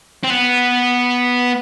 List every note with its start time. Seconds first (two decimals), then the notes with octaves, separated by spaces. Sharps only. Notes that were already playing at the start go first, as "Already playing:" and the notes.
0.24 C4
0.30 B3